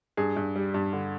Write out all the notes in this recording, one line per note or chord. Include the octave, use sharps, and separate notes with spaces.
G2 G#4
G2
G3
G2
D3